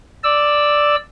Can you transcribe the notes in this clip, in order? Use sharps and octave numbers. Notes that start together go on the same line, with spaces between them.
D5 E6